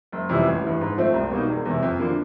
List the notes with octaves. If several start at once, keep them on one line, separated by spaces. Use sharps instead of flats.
F#1
F2 C3 E3 G3
A1
G2 E3
G#2
F3 A3 C4
C2
B2 G3 A#3 D#4
E1
E2 C3
F2
D3 F3 A#3